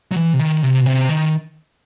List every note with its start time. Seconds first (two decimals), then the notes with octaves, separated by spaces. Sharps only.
0.12 F#3
0.16 E3
0.34 C3
0.40 D#3
0.63 C3
0.81 B2
0.86 C3
1.09 D#3